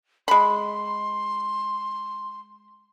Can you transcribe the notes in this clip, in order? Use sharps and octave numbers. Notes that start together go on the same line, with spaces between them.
G#3 B5 C6